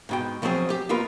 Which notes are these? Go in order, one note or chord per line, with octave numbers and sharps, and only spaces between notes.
G#2 B2 G5
B2 F3 F#3 C4 G#4
G4
A#3 B3 F4 A#4 B4